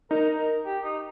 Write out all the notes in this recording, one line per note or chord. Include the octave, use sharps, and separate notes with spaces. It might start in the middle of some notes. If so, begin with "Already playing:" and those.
D#4 A#4
A#4
G4
D#4